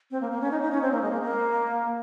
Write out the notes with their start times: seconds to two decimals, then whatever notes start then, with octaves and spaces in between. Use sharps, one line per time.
0.11 C4
0.21 A#3
0.31 A#3
0.41 C#4
0.51 D#4
0.61 D#4
0.71 C#4
0.82 C4
0.92 A#3
1.02 G#3
1.11 A#3
1.22 A#3